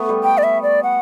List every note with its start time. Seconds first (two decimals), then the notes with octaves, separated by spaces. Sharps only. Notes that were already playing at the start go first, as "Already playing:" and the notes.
Already playing: A3 B3
0.09 G3
0.23 G5
0.38 D5
0.43 E5
0.63 D5
0.83 F#5